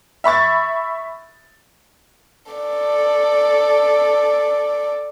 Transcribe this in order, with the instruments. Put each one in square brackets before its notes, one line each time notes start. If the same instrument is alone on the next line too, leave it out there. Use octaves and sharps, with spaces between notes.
[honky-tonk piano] E5 B5 C#6 A6
[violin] A4 D5